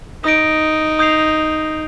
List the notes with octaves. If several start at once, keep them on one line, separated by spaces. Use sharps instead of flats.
D#4 D#6 A#6 D7
D#6 G6 C7 F7